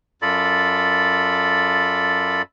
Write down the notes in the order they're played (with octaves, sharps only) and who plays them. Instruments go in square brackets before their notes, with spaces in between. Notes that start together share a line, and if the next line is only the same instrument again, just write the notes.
[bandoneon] F#2 F4 A4 D5 B5